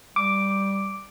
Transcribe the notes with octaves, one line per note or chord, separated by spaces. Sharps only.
G3 D6